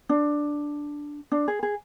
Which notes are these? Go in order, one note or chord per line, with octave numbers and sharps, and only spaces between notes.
D4
D4
G#4
G#4